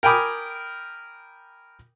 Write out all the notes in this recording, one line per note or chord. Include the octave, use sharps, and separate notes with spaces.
A#4 G5 G#5 B5 D6 D#6